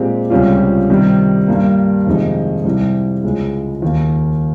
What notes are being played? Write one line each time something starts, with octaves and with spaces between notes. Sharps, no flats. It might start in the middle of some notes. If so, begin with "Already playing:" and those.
Already playing: A#2 G#3 C4 G4
C#2 C3 G3 C#4 F4
C3 D#3 G3
G2 G3 A#3
F2 C3 D#3 G#3 D#4
C2 C3 G3
C#2 C#3 G#3
D#2 D#3 A#3